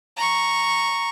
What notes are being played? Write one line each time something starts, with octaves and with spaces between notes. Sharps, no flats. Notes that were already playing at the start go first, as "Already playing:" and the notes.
A#5 C#6